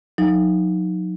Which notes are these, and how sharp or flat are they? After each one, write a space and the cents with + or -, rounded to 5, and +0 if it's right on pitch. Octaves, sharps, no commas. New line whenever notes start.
F#3 -35 D#4 +0